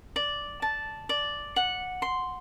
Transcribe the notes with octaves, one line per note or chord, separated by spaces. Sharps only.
D5
A5
D5
F#5
C6